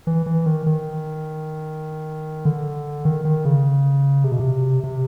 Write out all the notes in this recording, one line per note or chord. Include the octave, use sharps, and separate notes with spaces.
E3
E3
D#3
D#3
D3
D#3
D#3
C#3
C3
B2
C3
C3